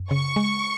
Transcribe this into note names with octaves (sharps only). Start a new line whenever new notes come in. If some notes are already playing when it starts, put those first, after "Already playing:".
Already playing: F#2
C#3 C#6
G#3